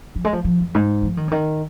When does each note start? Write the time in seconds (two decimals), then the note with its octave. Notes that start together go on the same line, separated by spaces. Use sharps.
0.16 F3
0.25 G#3
0.33 F3
0.44 F3
0.60 F2
0.74 G#2
1.03 F3
1.17 D#3
1.28 C#3
1.31 D#3